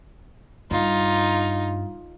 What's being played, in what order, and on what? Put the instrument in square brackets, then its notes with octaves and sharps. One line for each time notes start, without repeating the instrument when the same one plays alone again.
[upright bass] G2 [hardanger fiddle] D#4 F4